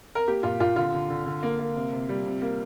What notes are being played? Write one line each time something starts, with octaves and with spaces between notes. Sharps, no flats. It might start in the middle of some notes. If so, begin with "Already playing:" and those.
A#4
A#3 G4
A#2 F4
A#2 F4
D3 F4
D3
D3
D3
A#3
A#3
C3
C3
G3
C3
A#3